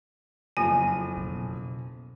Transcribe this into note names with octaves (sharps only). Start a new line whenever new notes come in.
F#1 F2 F4 A4 G#5
B2